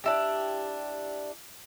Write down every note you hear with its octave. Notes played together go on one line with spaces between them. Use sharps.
D4 E4 G4